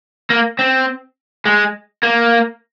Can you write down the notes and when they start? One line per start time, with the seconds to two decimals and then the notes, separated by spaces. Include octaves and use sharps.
0.30 A#3
0.59 C4
1.45 G#3
2.03 A#3